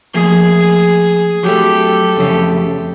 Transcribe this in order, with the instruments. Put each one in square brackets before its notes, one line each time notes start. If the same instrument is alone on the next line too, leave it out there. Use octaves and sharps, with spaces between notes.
[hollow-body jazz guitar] F3 A3 A#3 [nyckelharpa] G#4
[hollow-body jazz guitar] F#3 A3 [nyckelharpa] G4 A4
[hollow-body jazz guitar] F2 C#3 A3